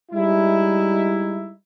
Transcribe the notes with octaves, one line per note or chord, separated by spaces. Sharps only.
G3 G#3 D#4 E4